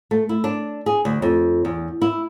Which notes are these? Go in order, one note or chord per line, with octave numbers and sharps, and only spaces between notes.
A3
E4
D4
G#4
D2
F2
E2
E4